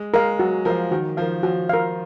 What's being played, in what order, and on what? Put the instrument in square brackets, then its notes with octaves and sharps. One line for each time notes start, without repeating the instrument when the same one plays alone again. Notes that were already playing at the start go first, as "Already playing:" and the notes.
Already playing: [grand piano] G#3
[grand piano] G#3 [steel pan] A#4 F5
[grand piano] F#3 [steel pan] F#4
[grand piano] F3 [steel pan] A#4 F5
[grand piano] D#3 [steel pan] F#4
[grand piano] F3 [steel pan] A#4 F5
[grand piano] F3 [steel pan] F#4
[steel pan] A#4 F5